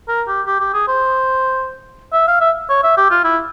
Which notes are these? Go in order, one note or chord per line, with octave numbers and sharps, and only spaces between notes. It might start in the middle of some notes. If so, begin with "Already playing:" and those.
A#4
G4
G4
G4
G#4
C5
E5
F5
E5
C#5
E5
G4
F4
E4